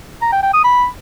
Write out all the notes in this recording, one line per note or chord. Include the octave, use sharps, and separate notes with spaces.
A#5
G5
G5
D#6
B5